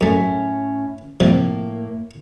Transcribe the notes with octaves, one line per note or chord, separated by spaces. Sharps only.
F#2 A2 A3 C#4 E5
A2 C3 F3 G3 A#3